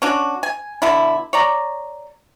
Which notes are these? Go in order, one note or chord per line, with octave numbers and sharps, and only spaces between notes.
C#4 D4 F#4
G#5
B2 D3 E4
C#5 D5 A#5